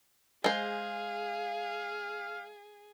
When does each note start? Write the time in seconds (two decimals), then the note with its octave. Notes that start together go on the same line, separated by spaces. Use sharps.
0.44 G#3 G#4 C5 F5